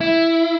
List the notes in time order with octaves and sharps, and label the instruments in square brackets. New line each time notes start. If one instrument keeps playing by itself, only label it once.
[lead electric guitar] E4